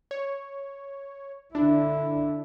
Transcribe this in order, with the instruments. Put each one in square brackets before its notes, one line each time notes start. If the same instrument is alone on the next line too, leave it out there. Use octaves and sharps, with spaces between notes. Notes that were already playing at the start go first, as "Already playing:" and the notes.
[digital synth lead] C#5
[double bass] D3 E4 [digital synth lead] D4